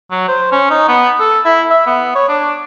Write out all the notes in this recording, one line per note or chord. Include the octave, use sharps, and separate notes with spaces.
F#3
C5
C#4
D#4
B3
A4
E4
E5
B3
C#5
D4